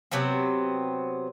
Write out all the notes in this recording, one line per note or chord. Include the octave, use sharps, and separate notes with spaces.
C3 F#3 B3 C4